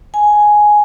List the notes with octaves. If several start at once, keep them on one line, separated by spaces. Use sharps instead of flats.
G#5